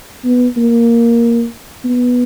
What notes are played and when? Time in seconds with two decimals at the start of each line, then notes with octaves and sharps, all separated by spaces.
0.25 B3
0.57 A#3
1.85 B3